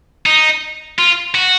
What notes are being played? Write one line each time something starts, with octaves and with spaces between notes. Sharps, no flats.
D#4
F4
F#4